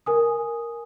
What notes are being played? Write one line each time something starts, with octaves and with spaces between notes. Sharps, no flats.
A#4 G#5 D#6